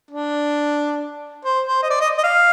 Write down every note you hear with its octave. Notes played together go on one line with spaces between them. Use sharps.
D4
C5
C5
D#5
D5
D#5
D#5
F5